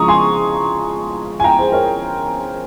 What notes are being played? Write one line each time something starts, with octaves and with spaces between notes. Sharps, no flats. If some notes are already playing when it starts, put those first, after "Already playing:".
Already playing: C#3 F3 G#3 A#5 C#6 D#6
G#5 C6
G#5
G5 A#5
G#4 C5
A#4 C#5